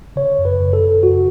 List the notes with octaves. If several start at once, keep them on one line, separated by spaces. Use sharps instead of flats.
C#3 C#5
F#2
B4
F#2
A4
C#3
F#2 F#4